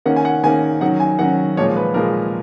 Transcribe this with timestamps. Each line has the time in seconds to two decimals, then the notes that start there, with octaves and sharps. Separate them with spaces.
0.06 D#3 A#3 C#4 F#5
0.16 G#5
0.25 F#5
0.44 D#3 A#3 C#4 G#5
0.81 D#3 F#3 C#4 F#5
1.00 G#5
1.19 D#3 F#3 C#4 F#5
1.57 A#2 F3 G#3 C#5
1.76 B4
1.94 A#2 F3 G#3 A#4